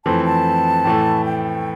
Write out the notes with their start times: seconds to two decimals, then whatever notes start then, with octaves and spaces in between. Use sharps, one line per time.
0.05 F2 E3 A3 C4 A5
0.25 A5
0.85 A2 E3 A3
1.25 G5